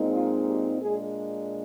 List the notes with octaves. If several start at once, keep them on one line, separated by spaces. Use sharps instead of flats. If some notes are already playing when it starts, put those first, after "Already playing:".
Already playing: A#2 G#3 C4 D#4
F4
G4
A#2 G#3 D4 G#4